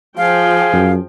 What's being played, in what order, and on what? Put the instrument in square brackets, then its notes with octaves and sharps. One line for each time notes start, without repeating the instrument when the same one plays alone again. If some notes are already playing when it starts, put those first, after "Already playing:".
[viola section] F3 G5 [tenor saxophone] G#4 [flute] F5
[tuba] F#2